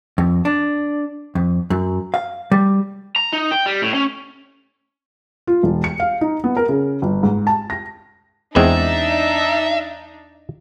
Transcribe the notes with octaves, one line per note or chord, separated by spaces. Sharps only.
F2
D4
F2
F#2
F5
G3
A#5
D#4
G5
G3
A2
C#4
F4
E1
C#7
F5
D#4
B3
A#4
C#3
G1
G#2
A5
A#6
E2 G#3 C4 D4 D#4 E5